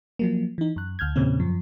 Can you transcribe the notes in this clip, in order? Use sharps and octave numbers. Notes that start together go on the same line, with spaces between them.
F3 F#3 A#3
E3 D#4
F#2 F#6
D2 F6 G6 G#6
E2 A#2 C#3 C4 C#4
F#2 F3